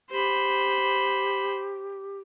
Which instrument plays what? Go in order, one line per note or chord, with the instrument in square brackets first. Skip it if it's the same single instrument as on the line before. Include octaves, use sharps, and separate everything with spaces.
[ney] G4 [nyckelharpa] C5 B5